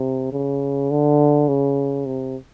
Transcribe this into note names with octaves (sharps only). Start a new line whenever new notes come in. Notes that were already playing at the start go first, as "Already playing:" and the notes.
Already playing: C3
C#3
D3
C#3
C3